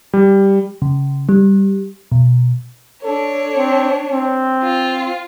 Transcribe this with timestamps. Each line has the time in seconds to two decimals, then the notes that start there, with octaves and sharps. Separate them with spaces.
0.13 G3
0.82 C#3
1.29 G3
2.12 B2
3.04 D4 A4 C#5
3.57 C4
4.12 C4
4.62 F4